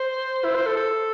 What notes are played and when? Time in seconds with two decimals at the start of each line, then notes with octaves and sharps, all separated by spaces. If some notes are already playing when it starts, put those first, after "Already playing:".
Already playing: C5
0.44 E4
0.55 C5
0.66 A4
0.77 A4